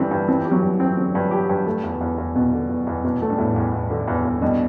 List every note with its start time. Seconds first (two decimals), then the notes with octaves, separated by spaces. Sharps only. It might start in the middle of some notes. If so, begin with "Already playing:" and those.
Already playing: G2 D3 E3 G3 C4
0.11 G2
0.28 E3 C4
0.45 G4
0.51 F#3
0.62 G2
0.74 E3
0.80 C4
0.97 D3 C4
1.15 G2
1.31 G4
1.49 G2
1.66 A3
1.84 E2
2.01 E2
2.18 E2
2.35 E2 B2
2.53 D3
2.70 E2
2.87 E2
3.04 E2 B2
3.22 A3
3.29 G2
3.38 E2 A2
3.56 E2
3.73 E2
3.90 D3
4.07 E2
4.25 E2
4.41 G2 B2